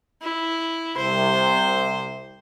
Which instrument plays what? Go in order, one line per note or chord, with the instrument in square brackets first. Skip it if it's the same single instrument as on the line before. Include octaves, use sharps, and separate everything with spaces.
[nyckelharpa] E4
[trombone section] C2 C3 [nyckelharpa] C5